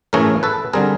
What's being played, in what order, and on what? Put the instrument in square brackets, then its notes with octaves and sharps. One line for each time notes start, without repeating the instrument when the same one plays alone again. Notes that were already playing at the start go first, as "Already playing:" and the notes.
[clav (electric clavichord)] A2 E3 A3 C#4 G#4 A#4
A4 B4
D3 G3 C4 G#4 A#4